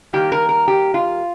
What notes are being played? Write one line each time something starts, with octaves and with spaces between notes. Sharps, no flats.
D#3 G3 A#3 G4
A#4
A#4
G4
F4